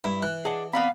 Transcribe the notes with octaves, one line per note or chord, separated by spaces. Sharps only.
G2 E4
E3 F#6
D4 G#4 D#5 F#5
B3 C4 D5 F5 A#5 B5